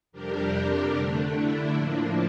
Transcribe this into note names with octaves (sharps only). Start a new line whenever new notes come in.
F2 C3 G3 D4 G4 A#4
D3 A3 D4
E4
A2 F3 A#3 D4